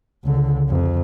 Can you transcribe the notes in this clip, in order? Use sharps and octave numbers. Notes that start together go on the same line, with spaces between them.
C#2 D3
F2